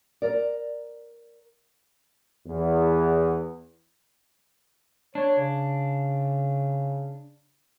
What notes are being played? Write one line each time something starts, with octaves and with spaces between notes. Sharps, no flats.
A#4 D5
E2
D4 C#5
C#3